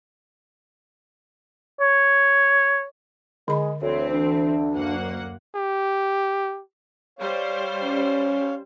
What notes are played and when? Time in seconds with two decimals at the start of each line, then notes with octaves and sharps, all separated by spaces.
1.80 C#5
3.48 D3 G#3 B5
3.82 D2 E3 C4 C#5
4.11 D4
4.74 F#2 A#3 F#5
5.55 G4
7.19 G3 C5 C#5 F5
7.83 C#4